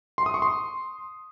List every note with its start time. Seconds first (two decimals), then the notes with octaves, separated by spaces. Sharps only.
0.18 C6
0.26 D#6
0.34 C#6
0.42 C6